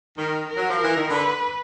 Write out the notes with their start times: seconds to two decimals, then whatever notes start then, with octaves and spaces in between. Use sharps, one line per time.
0.18 D#3 A#4
0.49 A#4
0.56 F#3
0.70 F3
0.80 E3 A#4
0.97 D#3
1.10 D3 B4